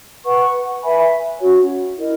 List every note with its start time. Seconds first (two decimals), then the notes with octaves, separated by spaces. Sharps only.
0.25 B4 F#5 C#6
0.82 B4 E5 G#5 B5
1.39 C#4 F#4 C#5
1.97 E4 A#4 D#5